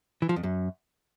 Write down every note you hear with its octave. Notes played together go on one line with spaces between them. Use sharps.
E3
F3
F2
F#2